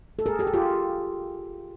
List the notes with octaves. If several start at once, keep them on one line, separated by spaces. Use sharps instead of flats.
A4
G#4 A#4
G4 A4
G#4
F4 G4